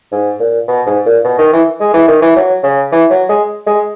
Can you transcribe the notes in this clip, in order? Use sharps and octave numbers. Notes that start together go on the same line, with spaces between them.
G#2
A#2
B2
G#2
A#2
B2
D#3
E3
G#3
E3
D#3
E3
F#3
C#3
E3
F#3
G#3
G#3